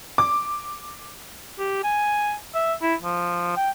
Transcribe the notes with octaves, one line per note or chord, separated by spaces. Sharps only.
D6
G4
G#5
E5
E4
F3
G5